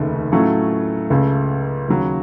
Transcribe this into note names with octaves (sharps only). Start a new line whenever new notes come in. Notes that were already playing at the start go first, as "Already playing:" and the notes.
Already playing: F1 D#2 C#3 A3
A2 F#3 A3 C#4 F4
C#2 C#3 A3
D#2 C#3 F#3